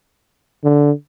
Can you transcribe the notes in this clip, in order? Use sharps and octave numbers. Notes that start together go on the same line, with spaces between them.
D3